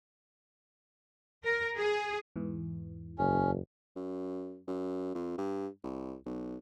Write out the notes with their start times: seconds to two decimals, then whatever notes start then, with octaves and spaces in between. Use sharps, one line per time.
1.44 A#4
1.76 G#4
2.36 E2 G#2 E3
3.18 F#1 C#4
3.96 F#2
4.68 F#2
5.15 F2
5.38 G2
5.84 C2
6.26 B1